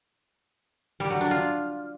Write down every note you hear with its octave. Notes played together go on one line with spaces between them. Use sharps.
G3
F#3
D4
F4